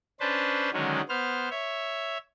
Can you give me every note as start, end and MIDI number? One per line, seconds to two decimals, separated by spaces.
0.20 0.70 61
0.20 0.70 62
0.20 0.70 71
0.20 0.70 72
0.20 0.70 81
0.73 1.01 50
0.73 1.01 51
0.73 1.01 54
0.73 1.01 56
0.73 1.01 61
1.09 1.49 59
1.09 1.49 72
1.09 1.49 89
1.50 2.18 73
1.50 2.18 76